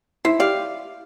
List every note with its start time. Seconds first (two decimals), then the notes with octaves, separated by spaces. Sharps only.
0.25 E4 C5 E5
0.39 G4 D5 F5